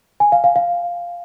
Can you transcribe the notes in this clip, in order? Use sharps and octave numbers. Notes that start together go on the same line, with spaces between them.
G#5
F5
F5
F5